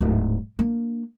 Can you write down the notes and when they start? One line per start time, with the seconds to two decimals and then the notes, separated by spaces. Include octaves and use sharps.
0.01 D1 G#2
0.59 A#3 D4